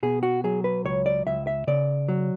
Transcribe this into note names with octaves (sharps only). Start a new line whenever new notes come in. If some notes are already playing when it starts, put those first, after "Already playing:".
B2 G#4
F#4
F#3 G#4
B4
C#2 C#5
D5
C#2 E5
E5
C#3 D5
F#3